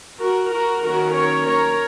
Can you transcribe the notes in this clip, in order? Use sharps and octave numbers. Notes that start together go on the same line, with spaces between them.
F#4 A#4
F#4 A#4
D#3 F#3 A#3 C#4 F#4 A#4
A#4 C#5
A#4 C#5